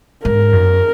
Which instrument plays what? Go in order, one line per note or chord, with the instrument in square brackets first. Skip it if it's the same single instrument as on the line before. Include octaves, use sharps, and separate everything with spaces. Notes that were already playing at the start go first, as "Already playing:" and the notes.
[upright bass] G#2 [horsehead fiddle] A#4
[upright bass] F#2